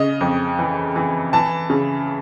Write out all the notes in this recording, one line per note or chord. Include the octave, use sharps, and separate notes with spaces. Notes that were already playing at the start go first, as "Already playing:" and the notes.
Already playing: C#3 D#5
F2
E3
E3
E3 A5
C#3